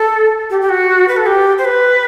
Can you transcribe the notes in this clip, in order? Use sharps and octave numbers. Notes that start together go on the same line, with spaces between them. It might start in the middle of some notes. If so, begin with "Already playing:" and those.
Already playing: A4
G4
G4
F#4
B4
A4
G4
C5
B4